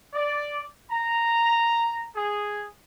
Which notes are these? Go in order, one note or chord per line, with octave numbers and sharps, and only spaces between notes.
D5
A#5
G#4